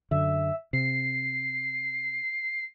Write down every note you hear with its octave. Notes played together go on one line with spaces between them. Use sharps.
F#2 D3 E5
C3 C7